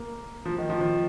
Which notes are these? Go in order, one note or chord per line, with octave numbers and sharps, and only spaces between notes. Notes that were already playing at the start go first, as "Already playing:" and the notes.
Already playing: A#3
F3
D#3
F3
F3